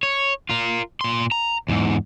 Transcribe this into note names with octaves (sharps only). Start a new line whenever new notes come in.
C#5
F4 A#4
A#2 C6
A#5
E2 G#2